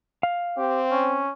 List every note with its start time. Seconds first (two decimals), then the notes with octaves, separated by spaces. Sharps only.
0.23 F5
0.58 C4 G4
0.91 C#4